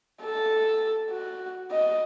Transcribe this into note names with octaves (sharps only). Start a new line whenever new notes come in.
A4
F#4
D#5